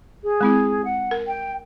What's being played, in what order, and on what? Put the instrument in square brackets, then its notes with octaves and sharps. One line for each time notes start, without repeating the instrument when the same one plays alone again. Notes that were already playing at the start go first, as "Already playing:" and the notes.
[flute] G#4
[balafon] G#3 C4 E4
[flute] F#5
[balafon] A#4
[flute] G5